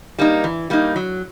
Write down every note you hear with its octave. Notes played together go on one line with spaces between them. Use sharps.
G3 A#3 D#4
E3
G3 A#3 D#4
F#3